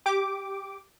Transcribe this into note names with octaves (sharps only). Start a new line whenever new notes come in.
G4 D6